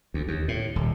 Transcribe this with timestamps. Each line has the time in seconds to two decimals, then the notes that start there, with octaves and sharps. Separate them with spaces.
0.14 D2
0.28 D#2
0.48 A2
0.76 D#1